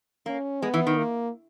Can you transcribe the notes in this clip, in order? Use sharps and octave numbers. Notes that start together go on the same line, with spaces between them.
A#3 C#4
G#3 B3
E3
D#3
A#3